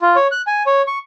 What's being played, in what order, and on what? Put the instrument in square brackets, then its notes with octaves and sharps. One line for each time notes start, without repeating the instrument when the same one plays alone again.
[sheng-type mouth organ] F4
C#5
F#6
G#5
C#5
C#6